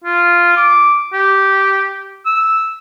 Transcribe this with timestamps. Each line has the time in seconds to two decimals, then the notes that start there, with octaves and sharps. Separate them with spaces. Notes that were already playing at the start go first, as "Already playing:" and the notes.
0.04 F4
0.56 D6
1.13 G4
2.26 E6